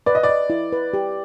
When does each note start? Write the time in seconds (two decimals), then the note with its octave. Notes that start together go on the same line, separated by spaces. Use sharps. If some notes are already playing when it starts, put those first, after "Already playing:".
0.06 B4 D5
0.15 D#5
0.23 D5
0.29 D#5
0.50 E4
0.72 B4
0.94 G4